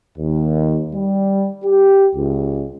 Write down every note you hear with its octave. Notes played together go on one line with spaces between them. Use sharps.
D#2
G3
G4
C#2